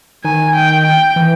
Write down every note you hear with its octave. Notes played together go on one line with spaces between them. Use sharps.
D#3 G#5
G5
G5
E3